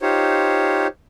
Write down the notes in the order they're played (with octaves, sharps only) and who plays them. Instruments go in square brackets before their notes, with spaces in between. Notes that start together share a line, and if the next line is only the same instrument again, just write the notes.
[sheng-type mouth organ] D#4 F4 G4 C5 C#5